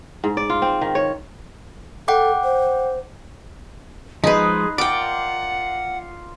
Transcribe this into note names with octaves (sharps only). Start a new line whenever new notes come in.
G#2
D5
F4
C4
D#3
C#5
A4 F#5 G5 D6
C5
F3 G#3 D#4 G#4 B4 C5 D#5
F4 A#4 D5 F#5 G5 D6